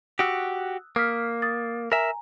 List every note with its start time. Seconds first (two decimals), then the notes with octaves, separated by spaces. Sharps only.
0.19 F#4 G4 D#6 E6 F#6
0.96 A#3 D#6 F6 B6
1.42 D#6 A6
1.92 A#4 E5 G#5 A#5